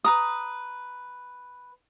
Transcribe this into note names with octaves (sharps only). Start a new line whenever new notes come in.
B4 A#5 D#6